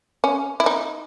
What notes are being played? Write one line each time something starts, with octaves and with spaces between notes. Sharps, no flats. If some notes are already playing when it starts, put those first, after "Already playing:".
C#4
E4
D#4